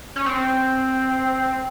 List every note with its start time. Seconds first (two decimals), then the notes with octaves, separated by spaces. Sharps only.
0.16 C#4
0.26 C4